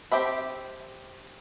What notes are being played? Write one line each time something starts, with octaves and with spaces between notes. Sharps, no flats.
C4 G4 E5 B5